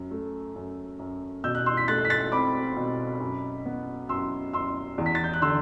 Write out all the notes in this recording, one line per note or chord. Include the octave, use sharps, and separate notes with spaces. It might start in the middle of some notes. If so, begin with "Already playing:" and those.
Already playing: F#2
A3
F#2
F#2
B2 E6 G6
F#6
C6 E6
B6
A3 F#6 A6
B6
F#6 A6
C4 B5 D6
B2
F#2
B3
F#2 C6 E6
F#2 C6 E6
E2
B6
A6
G6
F#6
D3 C6 E6